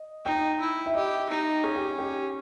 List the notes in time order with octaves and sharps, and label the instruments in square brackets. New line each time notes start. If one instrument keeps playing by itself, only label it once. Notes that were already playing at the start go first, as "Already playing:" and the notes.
Already playing: [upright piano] D#5
[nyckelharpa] D#4 [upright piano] G5
[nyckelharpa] E4
[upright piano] E5
[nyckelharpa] G4 [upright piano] D#5
[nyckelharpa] D#4
[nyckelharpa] C#4 [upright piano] G#4
[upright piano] G4
G4